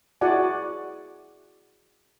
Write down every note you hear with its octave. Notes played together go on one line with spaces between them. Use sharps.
E4 F#4 G#4 D5 F#5 G#5